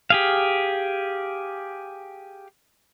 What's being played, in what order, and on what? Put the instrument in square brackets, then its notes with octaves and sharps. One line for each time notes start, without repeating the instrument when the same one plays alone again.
[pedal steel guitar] G4 G#4 F5